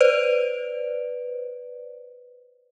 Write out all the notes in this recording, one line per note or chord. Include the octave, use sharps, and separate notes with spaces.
B4 C5 D5